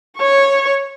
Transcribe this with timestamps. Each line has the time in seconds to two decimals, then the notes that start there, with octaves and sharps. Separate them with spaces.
0.17 C#5 C#6